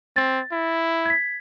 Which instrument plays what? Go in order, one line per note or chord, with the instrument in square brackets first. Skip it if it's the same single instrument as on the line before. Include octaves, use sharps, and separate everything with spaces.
[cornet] C4 [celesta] A6
[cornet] E4
[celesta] G#6 B6